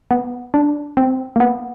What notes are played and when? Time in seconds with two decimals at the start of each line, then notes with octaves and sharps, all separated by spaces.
0.11 B3
0.54 D4
0.97 C4
1.36 A#3
1.40 B3